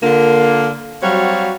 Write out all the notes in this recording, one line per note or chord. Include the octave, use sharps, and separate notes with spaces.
D3 A#3 F4
F#3 G3 C4 F#4 C#5 F5